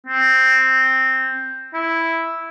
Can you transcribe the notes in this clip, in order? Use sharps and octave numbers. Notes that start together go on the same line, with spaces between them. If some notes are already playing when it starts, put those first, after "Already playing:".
C4
E4